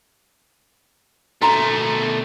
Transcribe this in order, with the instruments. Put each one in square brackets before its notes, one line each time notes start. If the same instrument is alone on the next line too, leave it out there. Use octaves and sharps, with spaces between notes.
[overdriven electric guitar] B2 A3 [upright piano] A#5 C6